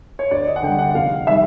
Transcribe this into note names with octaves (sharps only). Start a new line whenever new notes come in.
C#5
D2 D5
D#5
F#5
D3 G3 G5
F#5
F#5
F1 F5
D#3 G3 E5